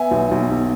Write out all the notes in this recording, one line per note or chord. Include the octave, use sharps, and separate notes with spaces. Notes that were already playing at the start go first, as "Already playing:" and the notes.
Already playing: B3 E5 G#5
B1
B1
B1